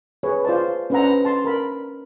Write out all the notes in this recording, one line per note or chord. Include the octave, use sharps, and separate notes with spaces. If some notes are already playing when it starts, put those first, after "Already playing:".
G#4 B4 C#5
F4 C5 D5 A5
C#4 D4 B4 C5 F#5 A#5
A5 C6
A#4 A#5 B5